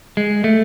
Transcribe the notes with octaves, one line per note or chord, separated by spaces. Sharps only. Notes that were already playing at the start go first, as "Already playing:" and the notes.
G#3
A3